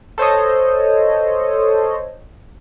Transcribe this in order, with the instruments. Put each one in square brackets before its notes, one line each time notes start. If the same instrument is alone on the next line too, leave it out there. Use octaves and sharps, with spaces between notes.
[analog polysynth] A4 C5 C#5 D#5